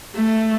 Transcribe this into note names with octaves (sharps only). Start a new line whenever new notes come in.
A3